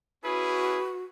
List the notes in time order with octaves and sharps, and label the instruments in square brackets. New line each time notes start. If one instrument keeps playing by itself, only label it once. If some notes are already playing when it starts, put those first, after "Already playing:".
[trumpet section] C#4 E4 G#4 [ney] F#4 [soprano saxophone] B4